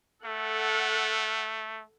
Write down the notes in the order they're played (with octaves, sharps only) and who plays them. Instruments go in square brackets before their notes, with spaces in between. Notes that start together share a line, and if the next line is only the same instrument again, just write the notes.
[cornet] A3 [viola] A4 F#5